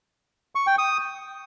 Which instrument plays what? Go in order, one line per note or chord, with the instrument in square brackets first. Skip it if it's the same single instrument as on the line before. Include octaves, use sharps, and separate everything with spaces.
[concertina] C#6
G5
D#6